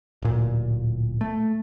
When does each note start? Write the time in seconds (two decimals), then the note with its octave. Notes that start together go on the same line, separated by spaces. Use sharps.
0.22 D1 A#2
1.21 A3